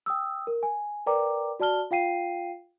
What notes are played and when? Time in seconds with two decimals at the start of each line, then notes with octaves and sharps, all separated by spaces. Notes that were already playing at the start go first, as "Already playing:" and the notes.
0.06 G5 D#6 E6
0.47 A#4
0.63 G#5
1.07 A#4 B4 D5 G5 A#5 D6
1.60 F#4 D5 A5 F6 G7
1.91 F4 F5 G5 C7 D#7